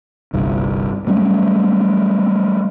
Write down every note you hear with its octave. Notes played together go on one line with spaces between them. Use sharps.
G1 C2 G2
F#3 G3 A3 C#4